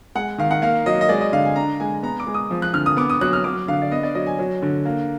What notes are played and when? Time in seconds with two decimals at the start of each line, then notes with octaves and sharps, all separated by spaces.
0.15 G#3 F#5
0.38 D#3 F5
0.51 F#5
0.62 A#3 F5
0.86 F#3 D#5
1.01 D#5
1.09 G#3 D5
1.21 D#5
1.32 D3 F5
1.45 G#5
1.56 D4 A#5
1.80 G#3 G#5
2.03 B3 A#5
2.20 D6
2.27 G#3
2.34 D#6
2.51 F3
2.62 F#6
2.73 D3 F6
2.86 D#6
2.97 B3 D6
3.10 D#6
3.21 F#3 F#6
3.33 F6
3.44 F#3 D6
3.68 D3 F5
3.82 D5
3.91 B3 D#5
4.03 D5
4.15 F#3 D#5
4.27 G#5
4.39 F#3
4.62 D3
4.85 A#3